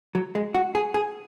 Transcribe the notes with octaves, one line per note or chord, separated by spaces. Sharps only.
F#3
G#3
F#4
G#4
G#4